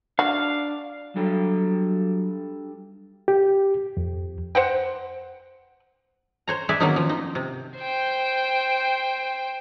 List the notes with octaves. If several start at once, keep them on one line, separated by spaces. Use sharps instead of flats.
D4 F#4 F5
F#3 G3 D4 A4
G4
F2
C5 F#5 G5
C5 C#5 A#5
G#4 B4 D5 E5
D#3 F#3 A#3 B3 C#4 D#4
F3
D#4
C3
C5 G5